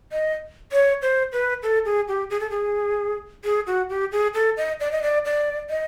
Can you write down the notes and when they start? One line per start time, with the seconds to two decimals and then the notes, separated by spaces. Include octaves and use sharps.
0.12 D#5
0.72 C#5
1.02 C5
1.33 B4
1.63 A4
1.85 G#4
2.08 G4
2.30 G#4
2.40 A4
2.50 G#4
3.44 G#4
3.67 F#4
3.89 G4
4.12 G#4
4.34 A4
4.57 D#5
4.80 D5
4.92 D#5
5.03 D5
5.25 D5
5.70 D#5